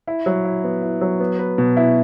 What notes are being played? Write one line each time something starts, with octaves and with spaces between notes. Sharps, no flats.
E4
F#3
E4
B3
E4
F#3
B3
B4
B2
E4